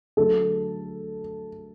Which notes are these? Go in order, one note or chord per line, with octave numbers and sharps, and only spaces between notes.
D3 F#3 A3 A4